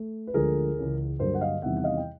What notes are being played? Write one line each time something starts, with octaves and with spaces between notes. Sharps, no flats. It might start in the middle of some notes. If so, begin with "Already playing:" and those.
Already playing: A3
B4
D2 D3 F3 G#3 G#4 A#4
C#2 C#3 E3
G2 D3 F#3 A#3 A#4 C5
F#5
D#5 F5
E2 C3 D#3 G3 E5 F#5
F#5
D#5 F5
G5